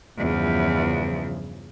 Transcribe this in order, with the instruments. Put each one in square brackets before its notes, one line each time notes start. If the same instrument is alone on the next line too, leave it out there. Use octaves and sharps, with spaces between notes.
[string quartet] E2 [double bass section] G2 C#3 F3